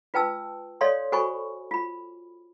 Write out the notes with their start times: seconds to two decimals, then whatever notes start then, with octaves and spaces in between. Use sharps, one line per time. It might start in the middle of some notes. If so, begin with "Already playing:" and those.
0.14 F4 B4 G5 A5 E6
0.81 A4 C#5 D5 F5 C6
1.12 F#4 A4 C5 G#5 B5 C#6
1.71 F4 B5